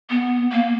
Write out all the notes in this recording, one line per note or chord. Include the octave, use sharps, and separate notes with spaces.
B3
A#3